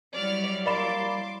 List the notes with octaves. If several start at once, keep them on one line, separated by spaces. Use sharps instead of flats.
F#3 G3 E4 D5 F6
A#3 D5 B5 C6 D6 E7